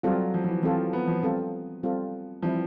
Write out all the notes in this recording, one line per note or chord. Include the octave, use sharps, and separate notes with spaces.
F#3 G3 C4 F4 A4
F3
F3
E3
F3 G3 C4 F4 A4
B3
F3
G3 C4 F4 A4
G3 C4 F4 A4
E3 F3 G3 C4 E4